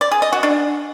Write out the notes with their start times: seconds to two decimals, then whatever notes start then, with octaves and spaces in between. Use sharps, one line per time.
0.01 D5
0.11 G#4
0.22 D#5
0.32 F#4
0.43 D4